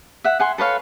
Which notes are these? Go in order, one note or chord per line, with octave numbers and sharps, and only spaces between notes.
E5 F#5
F#5 G#5 C6
A4 B4 C#5 F5